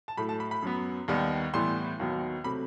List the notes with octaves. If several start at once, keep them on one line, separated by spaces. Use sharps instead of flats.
A5
A2 F#3 A3 B5
A5
B5
B5
F#2 F#3 B3
D#2 D#3 G3 B3
A2 E3 G3 B3 C6
D#2 D#3 F#3 B3
C3 F#3 A3 B5